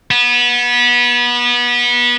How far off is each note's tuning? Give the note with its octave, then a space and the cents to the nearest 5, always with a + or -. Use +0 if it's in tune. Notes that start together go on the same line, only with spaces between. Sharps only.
B3 -25